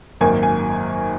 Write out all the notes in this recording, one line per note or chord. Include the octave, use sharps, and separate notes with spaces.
G#1 F#2 D#3 A#3 G#5
G#5